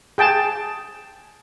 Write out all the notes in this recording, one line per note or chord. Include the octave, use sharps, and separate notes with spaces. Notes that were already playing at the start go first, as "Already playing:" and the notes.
G#4 G5 A5